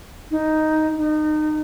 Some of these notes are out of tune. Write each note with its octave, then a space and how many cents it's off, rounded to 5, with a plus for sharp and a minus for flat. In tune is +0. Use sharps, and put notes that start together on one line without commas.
D#4 +5
D#4 -25